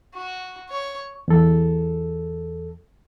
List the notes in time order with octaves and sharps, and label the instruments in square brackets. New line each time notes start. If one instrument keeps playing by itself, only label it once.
[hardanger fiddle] F#4
C#5
[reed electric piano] E2 A4